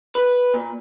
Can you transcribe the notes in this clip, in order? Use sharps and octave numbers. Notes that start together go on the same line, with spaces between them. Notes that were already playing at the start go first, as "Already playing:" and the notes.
B4
A#2